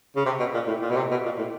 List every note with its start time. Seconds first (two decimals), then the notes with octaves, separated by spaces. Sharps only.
0.16 C#3
0.26 C3
0.39 B2
0.54 A#2
0.68 A2
0.82 A#2
0.90 B2
0.97 C3
1.11 B2
1.25 A#2
1.38 A2